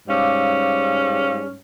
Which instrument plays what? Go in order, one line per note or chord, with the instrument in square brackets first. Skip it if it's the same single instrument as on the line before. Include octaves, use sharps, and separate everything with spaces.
[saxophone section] G#2 G3 C#4 [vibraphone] F5 D6 E6